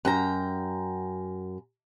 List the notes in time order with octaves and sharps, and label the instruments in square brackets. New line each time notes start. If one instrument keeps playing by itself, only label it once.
[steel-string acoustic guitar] F#2 G5 A#5